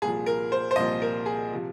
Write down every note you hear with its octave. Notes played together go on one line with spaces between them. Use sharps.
C2 A#2 F3 G#4
A#4
C5
C5
C2 A#2 F3 D#5
A#4
G#4
C3 F3